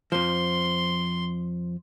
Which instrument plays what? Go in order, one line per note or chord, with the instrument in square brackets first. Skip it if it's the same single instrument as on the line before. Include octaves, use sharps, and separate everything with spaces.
[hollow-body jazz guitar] F2 F3 [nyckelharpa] C6